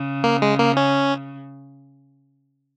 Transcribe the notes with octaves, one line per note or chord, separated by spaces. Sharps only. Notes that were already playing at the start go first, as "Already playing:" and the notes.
Already playing: C#3
A#3
G#3
A#3
C#4